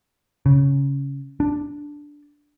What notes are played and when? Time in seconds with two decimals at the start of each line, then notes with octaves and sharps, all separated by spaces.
0.46 C#3
1.40 D4